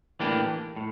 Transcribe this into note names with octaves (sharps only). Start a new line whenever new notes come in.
A2 E3 A#3 D4 G4
A2